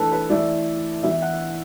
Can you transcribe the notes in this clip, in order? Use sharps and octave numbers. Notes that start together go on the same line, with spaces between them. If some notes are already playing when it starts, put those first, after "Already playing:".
Already playing: E3 A3 D4 A4 B4
B4
E3 A3 E4 D5
E3 B3 E4 E5
F#5